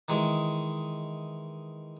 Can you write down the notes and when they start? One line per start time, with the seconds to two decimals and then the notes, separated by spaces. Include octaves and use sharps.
0.08 D#3 E3 G#3